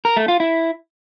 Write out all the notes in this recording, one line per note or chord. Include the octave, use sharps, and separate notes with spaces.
A#4
A3
F4
E4